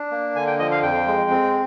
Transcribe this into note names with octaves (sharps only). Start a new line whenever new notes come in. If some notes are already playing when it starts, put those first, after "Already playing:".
Already playing: D4
A#3
D3 G#5
G5
F3 D#5
F5
F2 G5
G#3
C4